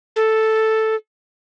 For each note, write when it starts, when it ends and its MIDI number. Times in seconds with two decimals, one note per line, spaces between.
0.16 0.95 69